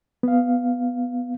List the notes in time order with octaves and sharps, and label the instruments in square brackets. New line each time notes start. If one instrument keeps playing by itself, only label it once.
[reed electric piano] B3 F5